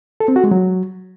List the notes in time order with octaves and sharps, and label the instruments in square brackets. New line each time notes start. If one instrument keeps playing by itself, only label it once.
[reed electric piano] A4
C4
F#4
G#3
F#3